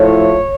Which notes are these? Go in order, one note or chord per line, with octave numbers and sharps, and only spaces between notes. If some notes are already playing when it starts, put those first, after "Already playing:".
Already playing: A2 F3 A3 C#5